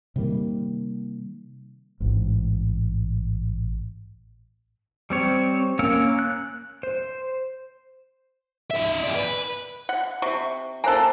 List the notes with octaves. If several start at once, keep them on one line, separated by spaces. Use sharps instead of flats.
C3 D#3 G3 A#3
A1 G#2
G3 C4 C#5
A#3 C#4 A#4 C#5 E6
F#6
C5
D#4 E5
G#4 D5
B4
F#5
C3 C#6
A#3 A4 C5 G#5